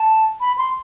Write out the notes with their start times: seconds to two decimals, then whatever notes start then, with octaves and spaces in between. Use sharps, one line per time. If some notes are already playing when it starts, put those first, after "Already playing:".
Already playing: A5
0.41 B5
0.58 C6